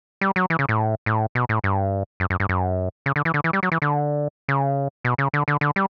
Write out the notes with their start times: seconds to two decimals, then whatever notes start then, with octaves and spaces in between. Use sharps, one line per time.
0.21 G3
0.36 F#3
0.50 E3
0.59 C#3
0.69 A2
1.06 A2
1.35 B2
1.49 A2
1.64 G2
2.20 F#2
2.30 F#2
2.40 G2
2.49 F#2
3.06 C#3
3.16 D3
3.25 E3
3.34 D3
3.44 E3
3.53 G3
3.63 F#3
3.72 E3
3.82 D3
4.48 C#3
5.04 B2
5.18 C#3
5.33 D3
5.48 D3
5.61 D3
5.76 G3